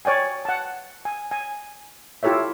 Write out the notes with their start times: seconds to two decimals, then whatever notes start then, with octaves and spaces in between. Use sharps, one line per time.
0.05 C#5 D5 G5 G#5
0.45 F#5 A5
1.05 G#5
1.31 G#5
2.23 E4 F4 G4 A4 C#5 E5